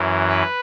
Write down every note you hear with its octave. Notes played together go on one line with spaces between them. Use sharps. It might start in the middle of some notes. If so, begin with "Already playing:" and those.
Already playing: F#2 E3
B4